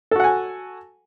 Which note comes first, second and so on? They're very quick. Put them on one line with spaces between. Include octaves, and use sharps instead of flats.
A4 F#4 F#5 G#5